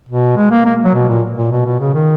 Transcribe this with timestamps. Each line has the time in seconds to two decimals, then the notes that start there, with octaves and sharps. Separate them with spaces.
0.09 B2
0.37 G#3
0.51 A#3
0.65 A#3
0.85 F#3
0.94 B2
1.09 A#2
1.37 A#2
1.52 B2
1.66 B2
1.80 C#3
1.94 D#3